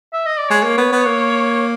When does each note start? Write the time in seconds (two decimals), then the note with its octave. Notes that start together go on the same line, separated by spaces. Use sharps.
0.13 E5
0.26 D#5
0.38 D5
0.49 G#3 C#5
0.64 A#3
0.78 B3
0.93 B3
1.06 A#3